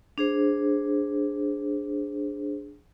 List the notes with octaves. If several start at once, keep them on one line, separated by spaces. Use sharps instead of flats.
D4 G#4 C5